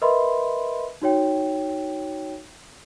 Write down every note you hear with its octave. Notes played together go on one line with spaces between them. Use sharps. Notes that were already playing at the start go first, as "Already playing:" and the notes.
A#4 B4 D#5 E5 B5 C6
D#4 F#4 C#5 G5